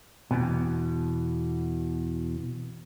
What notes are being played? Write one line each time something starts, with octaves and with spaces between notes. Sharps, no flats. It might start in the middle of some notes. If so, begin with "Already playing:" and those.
E2 B2